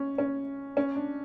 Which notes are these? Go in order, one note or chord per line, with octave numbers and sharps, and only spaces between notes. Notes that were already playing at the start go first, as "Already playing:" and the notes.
Already playing: C#4
C#4
C#4
D4